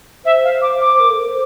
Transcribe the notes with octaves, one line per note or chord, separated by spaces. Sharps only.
C5 E5
F5
D6
D6
A#4
A4
A#4
C5